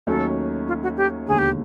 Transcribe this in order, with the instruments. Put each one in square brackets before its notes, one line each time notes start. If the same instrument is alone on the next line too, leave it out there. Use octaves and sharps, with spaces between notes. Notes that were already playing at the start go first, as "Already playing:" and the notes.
[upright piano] D#2 D#3 F#3 A3 C#4 [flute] A4
[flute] F4
F#4
G4
[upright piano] E1 D#2 D3 [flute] G#4
[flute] G4